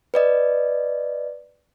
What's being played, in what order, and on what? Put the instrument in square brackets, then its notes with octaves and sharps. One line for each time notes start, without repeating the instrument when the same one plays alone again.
[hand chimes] B4 D5 D#5